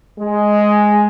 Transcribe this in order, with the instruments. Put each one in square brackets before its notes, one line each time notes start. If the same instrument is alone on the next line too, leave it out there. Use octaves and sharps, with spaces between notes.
[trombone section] G#3